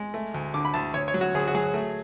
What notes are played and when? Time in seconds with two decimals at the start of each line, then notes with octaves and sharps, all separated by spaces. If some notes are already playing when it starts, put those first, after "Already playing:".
Already playing: G#3
0.14 A3
0.34 D2
0.54 D3 D6
0.65 B5
0.74 D2 A5
0.94 D2 C#5
1.08 C#5
1.14 F#3
1.21 F#4
1.34 D2 G#4
1.48 F#4
1.55 F#3 G#4
1.74 A3